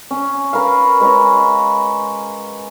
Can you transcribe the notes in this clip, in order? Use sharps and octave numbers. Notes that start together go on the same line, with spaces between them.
C#4
A#4 B4 F5
G#3 B4 C#5 A#5